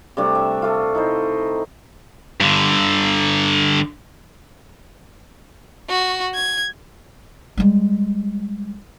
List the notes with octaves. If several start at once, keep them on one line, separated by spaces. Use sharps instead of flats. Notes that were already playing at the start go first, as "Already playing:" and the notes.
C3 G3 A3 D4
E5
A3 F4
D#4 E4 C5
G2 D3
F#4
G#6
G3 G#3